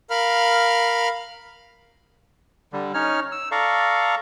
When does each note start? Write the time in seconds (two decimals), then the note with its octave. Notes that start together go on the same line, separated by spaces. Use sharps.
0.10 A#4 F5 B5 F6
2.73 D3 G3
2.94 C#4 D#4 C#5 F6
3.32 E6
3.51 A4 D5 F5 A#5 C#6